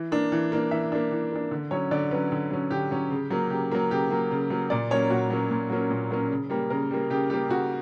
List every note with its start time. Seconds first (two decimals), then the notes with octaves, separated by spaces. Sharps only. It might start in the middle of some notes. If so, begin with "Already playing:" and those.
Already playing: E3
0.12 A#3 D4
0.32 E3
0.52 A#3 D4
0.71 E3 E5
0.92 A#3 D4
1.12 E3
1.32 A#3 D4
1.51 D3
1.71 F#3 C#4 C#5
1.91 D3 D5
2.11 F#3 C#4 B4
2.32 D3
2.51 F#3 C#4
2.70 D3 G4
2.91 F#3 C#4
3.11 C#3
3.30 F#3 A#3
3.50 C#3 G4
3.71 F#3 A#3
3.91 C#3 G4
4.10 F#3 A#3
4.31 C#3
4.50 F#3 A#3
4.70 A#2 D5
4.91 F#3 A#3 C#4 C#5
5.10 A#2 F#4
5.30 F#3 A#3 C#4
5.51 A#2
5.70 F#3 A#3 C#4
5.91 A#2
6.11 F#3 A#3 C#4
6.31 C#3
6.50 G3 A#3
6.70 C#3 A#4
6.91 G3 A#3
7.10 C#3 G4
7.30 G3 A#3 G4
7.49 C#3 F#4